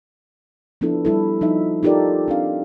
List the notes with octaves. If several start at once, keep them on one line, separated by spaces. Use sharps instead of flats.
F3 B3 D4 E4 A4
G3 E4 A4
F3 D#4 E5
D#4 F4 G4 A4 A#4 D5
C4 D4 F5